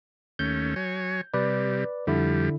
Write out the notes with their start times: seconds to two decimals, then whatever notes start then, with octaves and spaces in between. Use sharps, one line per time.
0.39 D#2 A3 C#4 G6
0.76 F#3 C#5 G#5
1.34 C3 G3 B4 D5
2.07 F2 D3 G3 E4